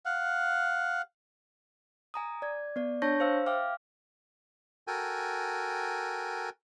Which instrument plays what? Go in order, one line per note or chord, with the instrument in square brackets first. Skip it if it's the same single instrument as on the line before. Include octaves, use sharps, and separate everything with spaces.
[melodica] F5 F#5
[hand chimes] G#5 A#5 D#6
D5 G#6
B3 D5
D4 C#5 A5 C#6 G6 A#6
C5 F5 E6
E5 F5 G5 D6 F6
[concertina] F#4 A4 A#4 G5 G#5